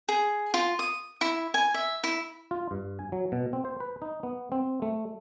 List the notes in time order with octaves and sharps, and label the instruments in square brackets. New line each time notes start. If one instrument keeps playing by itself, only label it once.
[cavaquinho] G#4
F4
D#6
E4
G#5
E5
E4
[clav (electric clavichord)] F4
G2
G#5
F#3
B2
C4
C5
B4
D#4
B3
C4
A3